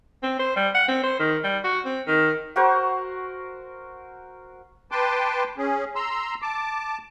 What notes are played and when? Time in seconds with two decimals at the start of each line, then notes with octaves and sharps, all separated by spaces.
0.23 C4
0.39 C5
0.56 G3
0.74 F#5
0.88 C4
1.04 C5
1.19 D#3
1.44 G3
1.64 F#4
1.85 C4
2.07 D#3
2.56 F#4 A#4 C5 C#6
4.91 B4 G5 A5 C6 D6
5.58 C#4 G#4
5.95 A#5 C6 E6
6.42 A5 D6